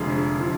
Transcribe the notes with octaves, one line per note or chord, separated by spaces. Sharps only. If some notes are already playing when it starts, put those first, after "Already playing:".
Already playing: F1 F2 D3 G#3
D3 F3